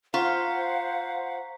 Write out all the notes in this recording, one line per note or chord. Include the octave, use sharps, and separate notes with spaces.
F4 C5 F5 F#5 A#5 C#6 B6